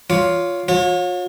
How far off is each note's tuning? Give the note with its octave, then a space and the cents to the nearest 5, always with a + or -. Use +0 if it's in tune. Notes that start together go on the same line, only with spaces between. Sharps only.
F4 +5 C#5 +20 D6 +0
F4 +45 C#5 -20